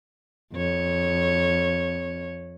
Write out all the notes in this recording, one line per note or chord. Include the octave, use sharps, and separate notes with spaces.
F2 C#5